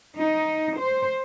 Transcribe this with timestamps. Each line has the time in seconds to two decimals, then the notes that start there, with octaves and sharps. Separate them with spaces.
0.17 D#4
0.79 C5